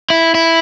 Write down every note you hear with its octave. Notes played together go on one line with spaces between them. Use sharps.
E4
E4